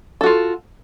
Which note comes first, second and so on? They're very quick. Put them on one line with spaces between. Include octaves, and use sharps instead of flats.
A4 F#4 F4